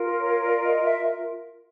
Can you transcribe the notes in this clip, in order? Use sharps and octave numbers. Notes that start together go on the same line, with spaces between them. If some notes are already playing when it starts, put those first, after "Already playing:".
Already playing: F4 A#4
C#5
D5
D#5
E5